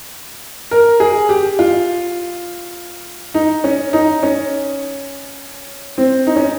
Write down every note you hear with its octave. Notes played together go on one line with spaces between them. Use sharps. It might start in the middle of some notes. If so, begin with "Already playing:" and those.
A#4
G#4
G4
F4
D#4
C#4
D#4
C#4
C4
D#4
C#4